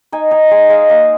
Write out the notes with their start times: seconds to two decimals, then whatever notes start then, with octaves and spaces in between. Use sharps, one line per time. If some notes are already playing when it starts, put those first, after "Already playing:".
0.12 D#4 G#5
0.31 D#4 G#5
0.51 G#3 G#5
0.69 G#3 F5
0.89 A#3 F5